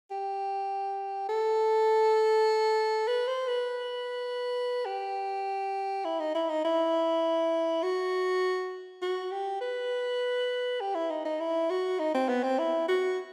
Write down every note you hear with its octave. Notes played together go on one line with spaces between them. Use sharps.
G4
A4
B4
C5
B4
G4
E4
D#4
E4
D#4
E4
F#4
F#4
G4
B4
G4
E4
D#4
D#4
E4
F#4
D#4
C4
B3
C4
E4
F#4